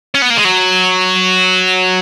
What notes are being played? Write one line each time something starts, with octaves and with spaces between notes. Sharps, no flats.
C#4
B3
A#3
G#3
F#3